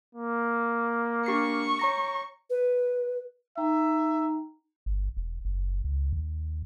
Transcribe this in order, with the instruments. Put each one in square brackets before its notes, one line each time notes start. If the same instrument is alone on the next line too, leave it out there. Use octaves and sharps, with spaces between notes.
[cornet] A#3
[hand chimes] D4 G4 C7 [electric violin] C#6
[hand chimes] C#5 A#5 A#6
[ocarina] B4
[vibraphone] D#4 G5 A#5 [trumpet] E5
[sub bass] G1
E1
F#1
C#2
D#2